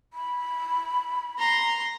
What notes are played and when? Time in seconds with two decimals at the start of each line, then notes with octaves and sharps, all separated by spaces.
0.13 B5
1.39 A#5 C6